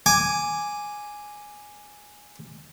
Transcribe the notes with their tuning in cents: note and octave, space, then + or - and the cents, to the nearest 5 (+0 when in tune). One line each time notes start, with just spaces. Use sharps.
G#5 +0 D6 +0